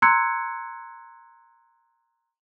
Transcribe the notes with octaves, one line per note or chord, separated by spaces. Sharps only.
A#5 C6 E6 F#6 G#6 C#7